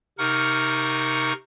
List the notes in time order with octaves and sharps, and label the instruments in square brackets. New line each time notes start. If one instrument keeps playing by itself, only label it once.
[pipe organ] C3 D#4 A#4 F#5 C#6 F6